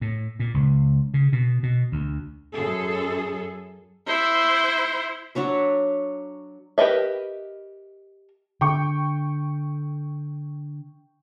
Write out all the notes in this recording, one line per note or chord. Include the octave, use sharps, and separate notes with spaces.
A2
A#2
C#2
C#3
B2
B2
D2
F#2 G#4 A4
E4 C5
F#3 D4 C#5 E5
G4 A#4 B4 D#5 E5
D3 G5 C#6